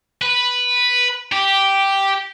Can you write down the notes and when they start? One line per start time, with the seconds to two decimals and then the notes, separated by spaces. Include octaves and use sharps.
0.22 B4
1.33 G4